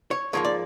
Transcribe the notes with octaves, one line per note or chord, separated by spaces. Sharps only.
C#5
G#2 F3 A#3 C#5
D5